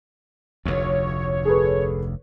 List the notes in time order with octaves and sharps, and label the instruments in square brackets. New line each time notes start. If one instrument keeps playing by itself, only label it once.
[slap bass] F1 D2 [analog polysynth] C#5
[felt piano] G#4 A4 B4